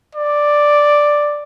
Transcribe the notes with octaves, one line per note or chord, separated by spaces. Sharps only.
D5